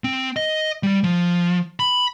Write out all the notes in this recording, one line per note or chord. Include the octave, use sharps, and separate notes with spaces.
C4
D#5
G3
F3
B5